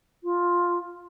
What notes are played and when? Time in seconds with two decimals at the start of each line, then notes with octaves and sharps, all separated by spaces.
0.24 F4